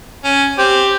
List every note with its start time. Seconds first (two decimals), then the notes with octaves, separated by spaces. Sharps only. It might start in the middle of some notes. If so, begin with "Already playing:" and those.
0.24 C#4
0.58 C4 G4